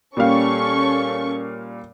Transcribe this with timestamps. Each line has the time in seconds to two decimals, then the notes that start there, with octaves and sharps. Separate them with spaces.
0.17 A#2 G3 C#4 A4 F5 C#6